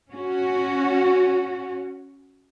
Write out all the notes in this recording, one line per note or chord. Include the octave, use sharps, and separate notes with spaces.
C#4 F#4